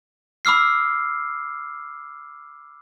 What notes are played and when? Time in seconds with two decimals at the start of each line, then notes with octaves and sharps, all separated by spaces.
0.45 B5 D6 E6 F6 C7